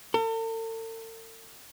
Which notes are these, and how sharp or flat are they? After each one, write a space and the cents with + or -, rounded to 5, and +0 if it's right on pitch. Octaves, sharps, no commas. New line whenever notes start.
A4 +45